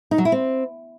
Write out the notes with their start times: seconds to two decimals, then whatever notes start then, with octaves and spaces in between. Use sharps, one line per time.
0.11 D#4
0.18 F#3
0.25 E4
0.32 C4